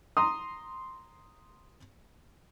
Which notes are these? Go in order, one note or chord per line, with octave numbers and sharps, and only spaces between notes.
A#5 C6 D#6